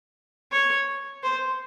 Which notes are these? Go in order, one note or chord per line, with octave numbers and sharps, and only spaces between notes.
C#5
C5